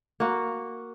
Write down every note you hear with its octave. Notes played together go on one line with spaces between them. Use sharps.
A#3 F#4